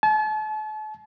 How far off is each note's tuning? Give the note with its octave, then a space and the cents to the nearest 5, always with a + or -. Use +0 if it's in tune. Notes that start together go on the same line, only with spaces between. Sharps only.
A5 -40